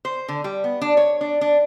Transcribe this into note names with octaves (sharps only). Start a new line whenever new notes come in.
C5
D3
G3
B3
D4
C#5
D4
D4